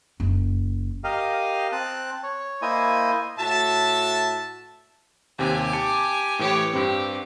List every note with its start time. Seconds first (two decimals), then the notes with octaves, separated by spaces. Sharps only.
0.20 F#1
1.04 G4 A#4 D#5 F5
1.72 C4 A5 F#6
2.23 C#5
2.62 A#3 E4 C5 D#5 G#5
3.39 A2 F#4 E5 A5
5.39 D#2 C3 C4 G4 G#5
5.73 A5 D6 C#7
6.39 A2 E3 G4 C#5
6.73 G2 C4 G4